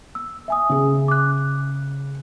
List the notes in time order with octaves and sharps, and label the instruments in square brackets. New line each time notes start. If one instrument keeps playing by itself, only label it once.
[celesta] E6
E5 G#5 D#6
[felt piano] C#3 G#4
[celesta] D6 F#6